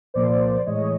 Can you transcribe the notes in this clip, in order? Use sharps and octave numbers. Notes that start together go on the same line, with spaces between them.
C2 A#2 F3 A#3 C5 D5
A2 E3 G#3 C#5 D#5